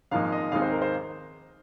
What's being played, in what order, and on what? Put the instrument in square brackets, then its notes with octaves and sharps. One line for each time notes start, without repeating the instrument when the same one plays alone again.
[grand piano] G#1 G#2 F3 A#3 D#4 F5
D#5
D#2 D#3 G#3 C4 D#4 F5
C5
A#4
C5